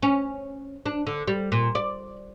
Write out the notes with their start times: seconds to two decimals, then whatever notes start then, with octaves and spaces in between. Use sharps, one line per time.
0.02 C#4
0.86 D4
1.07 D3
1.27 G3
1.52 A#2
1.75 D5